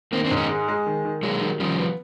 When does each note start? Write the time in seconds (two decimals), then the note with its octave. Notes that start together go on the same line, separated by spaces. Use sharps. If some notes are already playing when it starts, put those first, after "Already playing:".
0.12 D#3 A#3 C4
0.25 C4 D4
0.31 G#2
0.36 C#4 D#4
0.49 G#3
0.68 G#3
0.86 D#3
1.05 D#3
1.23 F#3 G#3 A#3
1.41 D#3
1.60 C#3 F3 G3
1.78 B3